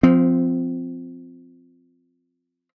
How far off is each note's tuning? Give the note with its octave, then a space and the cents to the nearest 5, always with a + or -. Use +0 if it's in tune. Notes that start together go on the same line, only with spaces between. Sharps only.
F3 +0 C4 -20